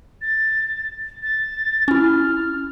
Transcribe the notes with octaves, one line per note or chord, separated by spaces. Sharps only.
A6
A6
C#4 E4 F6